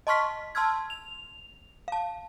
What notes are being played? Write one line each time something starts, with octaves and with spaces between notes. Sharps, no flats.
D#5 A5 C6 C#6 F6 B6
A5 C6 E6 F6 G#6
F7
F5 A5